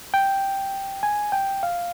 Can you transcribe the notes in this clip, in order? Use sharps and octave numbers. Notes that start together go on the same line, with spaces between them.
G5
G#5
G5
F5